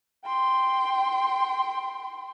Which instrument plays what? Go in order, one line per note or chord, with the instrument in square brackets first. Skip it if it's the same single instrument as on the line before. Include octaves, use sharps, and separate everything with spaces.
[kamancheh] G5 C6